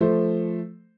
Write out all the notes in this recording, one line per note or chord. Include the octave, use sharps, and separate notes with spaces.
F3 A3 C5